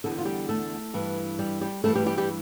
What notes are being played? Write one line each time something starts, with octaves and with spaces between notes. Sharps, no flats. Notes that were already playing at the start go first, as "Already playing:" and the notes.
E2 D3 A4
G4
F4
G3 G4
A3 A4
G2 E3
G3 G4
G3 G4
G2 E3 A3 A4
G3 G4
G3 G4
G3 G4